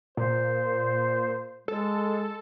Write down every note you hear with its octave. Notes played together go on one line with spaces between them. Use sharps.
A#2 C5
G#3 A4